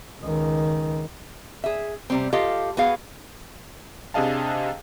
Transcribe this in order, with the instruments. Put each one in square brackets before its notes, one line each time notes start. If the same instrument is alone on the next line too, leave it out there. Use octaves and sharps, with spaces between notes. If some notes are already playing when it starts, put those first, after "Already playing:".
[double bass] C#2 D#3
[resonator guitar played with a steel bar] G#4 E5
C3 G3 C4
F4 G4 A4 D#5 F5
B3 F#4 G#4 F5
[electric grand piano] C3 D4 G#4 D#5 F5 A5